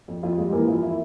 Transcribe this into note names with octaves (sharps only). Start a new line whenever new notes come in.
F2
F2 F4
G3 G#3 G#4
E3 A#3 A#4
F2 F4
E4